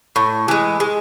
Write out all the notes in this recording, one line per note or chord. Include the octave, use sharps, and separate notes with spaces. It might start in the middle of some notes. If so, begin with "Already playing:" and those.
A2
E3 G#3
G#3